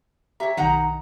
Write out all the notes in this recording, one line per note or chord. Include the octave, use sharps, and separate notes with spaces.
G4 C#5 E5 A#5
B1 D#3 D#4 F#5 A#5